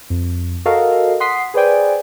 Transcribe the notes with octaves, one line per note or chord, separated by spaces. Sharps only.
F2
F#4 A4 A#4 D#5 F5
F#5 C6 D#6 B6 C7
G#4 B4 C5 D5 G5 G#5